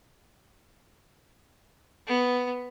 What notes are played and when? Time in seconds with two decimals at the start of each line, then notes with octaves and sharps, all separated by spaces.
2.07 B3